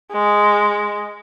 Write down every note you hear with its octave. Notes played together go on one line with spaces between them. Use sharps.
G#3